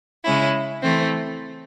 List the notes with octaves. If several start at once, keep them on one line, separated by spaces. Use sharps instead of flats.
C#3 G#3 C#4 E4
E3 A3 C4